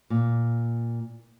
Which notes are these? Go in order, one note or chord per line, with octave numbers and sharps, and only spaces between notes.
A#2